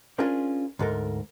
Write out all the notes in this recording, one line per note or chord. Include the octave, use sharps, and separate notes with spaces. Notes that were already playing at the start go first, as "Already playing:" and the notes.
C#4 D4 F4 G#4 A#4 C5
D2 G#2 A4 A#4